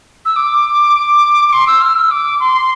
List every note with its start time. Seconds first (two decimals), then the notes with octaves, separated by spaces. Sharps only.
0.25 E6
0.36 D6
1.48 D6
1.52 C6
1.67 E6
1.82 F6
1.95 E6
2.10 D6
2.39 C6